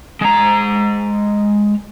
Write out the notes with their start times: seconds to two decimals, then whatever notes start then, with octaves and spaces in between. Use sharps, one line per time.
0.21 G#3 A#5